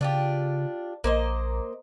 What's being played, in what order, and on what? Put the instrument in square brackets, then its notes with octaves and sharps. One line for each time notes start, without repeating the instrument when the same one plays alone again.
[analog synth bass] C#3 [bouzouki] D4 F4 G4
[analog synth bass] A#1 [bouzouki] A#3 C5 D#5